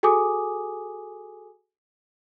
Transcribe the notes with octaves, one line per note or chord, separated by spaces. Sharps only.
F#4 G#4 A4 G#5 D6 D#6